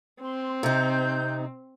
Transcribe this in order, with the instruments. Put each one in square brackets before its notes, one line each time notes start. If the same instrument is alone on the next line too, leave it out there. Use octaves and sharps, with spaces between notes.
[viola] C4 [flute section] C6
[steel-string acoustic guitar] C3 D#4 [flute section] G6